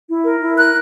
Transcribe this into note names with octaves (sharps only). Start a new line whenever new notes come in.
E4
A#4
E4
A#4 F#6